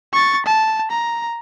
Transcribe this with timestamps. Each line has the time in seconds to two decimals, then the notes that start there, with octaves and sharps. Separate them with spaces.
0.13 C#6 A6
0.46 A5
0.91 A#5